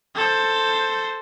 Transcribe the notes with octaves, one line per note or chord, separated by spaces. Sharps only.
A4 C5